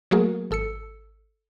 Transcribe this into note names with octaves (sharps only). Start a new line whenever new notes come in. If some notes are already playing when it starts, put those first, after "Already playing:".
F#3 A3 A#3 F#4 G#4 A#4
G#1 A4 E6 C#7